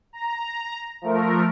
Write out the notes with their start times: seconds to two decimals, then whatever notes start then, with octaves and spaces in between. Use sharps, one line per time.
0.13 A#5
1.02 F3 A3 A#4